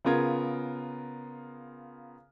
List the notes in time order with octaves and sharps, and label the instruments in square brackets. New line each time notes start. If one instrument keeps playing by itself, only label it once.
[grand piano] C#3 B3 F4 A#4 G#6